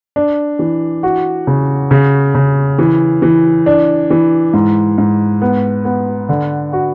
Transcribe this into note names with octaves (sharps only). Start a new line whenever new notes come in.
D4
E3
F#4
C#3
C#3
C#3
E3
E3
D4
E3
G#2
G#2
B3
B3
D3
F#4